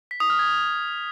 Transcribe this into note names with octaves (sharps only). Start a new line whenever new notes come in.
B6
D#6
F6
G#6